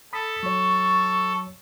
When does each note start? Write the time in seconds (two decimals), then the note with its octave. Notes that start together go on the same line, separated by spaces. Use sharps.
0.13 A4 B5 D#6 B6
0.43 F#3 C#5 C#6